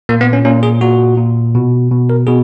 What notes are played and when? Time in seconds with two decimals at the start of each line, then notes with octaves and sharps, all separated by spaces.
0.09 A#2 A#3
0.21 B3
0.33 C#4
0.45 A#2 C#4
0.63 G#4
0.81 A#2 F#4
1.17 A#2
1.55 B2
1.91 B2
2.10 A#4
2.27 B2 G#4